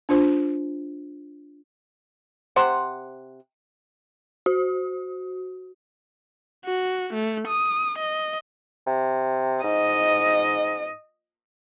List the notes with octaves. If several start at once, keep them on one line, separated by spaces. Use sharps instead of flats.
D4 F4 C5
C3 C5 F#5
F#4
F#4
A3
D#6
D#5
C3
G#2 D#5